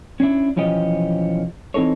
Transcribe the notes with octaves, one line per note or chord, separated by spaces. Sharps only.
C#4 D4 E4
B1 E3 F3 C#4 G4 D#5
E3 C4 D#4 A4 C#5